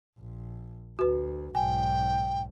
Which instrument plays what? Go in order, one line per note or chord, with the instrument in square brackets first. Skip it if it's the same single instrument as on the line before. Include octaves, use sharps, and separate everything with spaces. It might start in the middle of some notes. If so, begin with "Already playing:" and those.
[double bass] A#1
[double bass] D2 [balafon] F#4 B4
[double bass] B1 G#2 [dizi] G5 [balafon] G#5